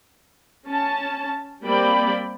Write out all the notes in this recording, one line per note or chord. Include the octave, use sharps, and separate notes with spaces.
C#4 A5
G3 A#3 C4 D5 G5 B5